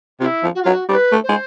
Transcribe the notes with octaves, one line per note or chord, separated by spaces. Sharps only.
C3 F4
E4
F3
F#4
F4
F#3
F#4
G3 C5
B4
A3
C5
G#3